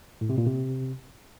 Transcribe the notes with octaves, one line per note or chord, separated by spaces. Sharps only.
A2
C3
A#2
C3